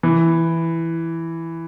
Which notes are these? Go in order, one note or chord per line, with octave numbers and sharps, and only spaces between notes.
E3